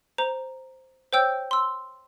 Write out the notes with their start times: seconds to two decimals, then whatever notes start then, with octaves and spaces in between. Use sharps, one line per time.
0.18 C5 A#5
1.13 C5 C#5 G5 E6 G6
1.51 C6 E6